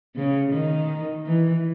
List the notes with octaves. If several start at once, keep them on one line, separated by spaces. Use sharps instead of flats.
C#3
D#3
E3